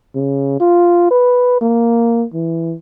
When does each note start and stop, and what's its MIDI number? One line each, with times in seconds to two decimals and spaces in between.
0.15 0.59 49
0.60 1.06 65
1.11 1.61 71
1.61 2.25 58
2.34 2.75 52